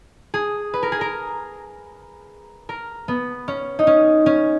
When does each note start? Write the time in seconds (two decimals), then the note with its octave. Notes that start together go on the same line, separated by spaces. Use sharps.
0.34 G#4
0.74 B4
0.83 A#4
0.92 G#4
1.01 A#4
2.69 A#4
3.08 B3
3.48 C#4
3.79 D#4
3.87 C#4
4.26 C#4